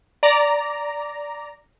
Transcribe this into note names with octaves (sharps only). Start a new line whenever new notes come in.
D5 A#5